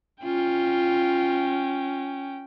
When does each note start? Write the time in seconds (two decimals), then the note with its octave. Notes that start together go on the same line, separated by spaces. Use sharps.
0.24 C#4 F4 G5